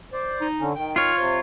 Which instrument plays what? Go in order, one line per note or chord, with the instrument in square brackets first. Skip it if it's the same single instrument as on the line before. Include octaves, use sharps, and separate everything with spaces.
[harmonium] C5 D5
[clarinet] D#4
[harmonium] D3 C#4
[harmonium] D#3 [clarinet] G5
[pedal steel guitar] F4 C#5 [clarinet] F6
[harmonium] C3 [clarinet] C5